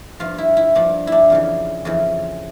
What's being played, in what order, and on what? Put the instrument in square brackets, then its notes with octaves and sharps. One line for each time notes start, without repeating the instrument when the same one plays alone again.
[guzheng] G2 F3 F4
E4
E4
G2 F3 D4
D4 E4
F2 C#3 E3
F2 C#3 E3